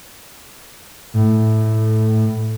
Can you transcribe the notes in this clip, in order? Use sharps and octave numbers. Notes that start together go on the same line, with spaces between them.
A2